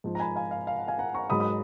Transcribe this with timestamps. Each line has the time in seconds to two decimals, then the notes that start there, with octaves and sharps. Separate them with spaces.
0.04 G#2 F3
0.15 A#5
0.20 G#5 B5
0.36 F5 G#5
0.51 F5
0.67 F5
0.78 F#5
0.88 F5 G#5
0.99 F#5 A#5
1.14 A#5 C#6
1.30 G#2 F#3 B5 D#6
1.40 B5 D#6